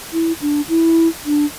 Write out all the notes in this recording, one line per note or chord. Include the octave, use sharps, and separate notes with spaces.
E4
D4
E4
D4